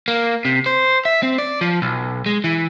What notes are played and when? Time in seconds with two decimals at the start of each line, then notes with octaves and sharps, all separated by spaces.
0.08 A#3
0.45 C3
0.66 C5
1.05 E5
1.23 C4
1.38 D5
1.61 F3
1.82 B1
2.26 G#3
2.44 E3